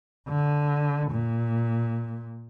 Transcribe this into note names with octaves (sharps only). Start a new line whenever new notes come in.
D3
A#2